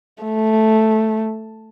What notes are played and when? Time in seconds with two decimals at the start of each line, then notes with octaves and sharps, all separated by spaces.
0.23 A3